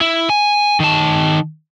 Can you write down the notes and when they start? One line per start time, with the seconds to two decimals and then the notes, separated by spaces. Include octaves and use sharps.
0.01 E4
0.30 G#5
0.80 D#3 A5